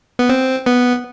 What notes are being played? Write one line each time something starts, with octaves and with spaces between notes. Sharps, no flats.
B3
C4
B3